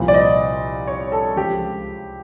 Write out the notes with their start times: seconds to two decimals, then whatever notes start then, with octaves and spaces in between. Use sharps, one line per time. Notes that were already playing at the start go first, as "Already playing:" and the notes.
Already playing: C2 A#2 F3
0.08 D5
0.14 D#5
0.87 C#5
1.12 A4
1.36 C#2 C#3 F3 G4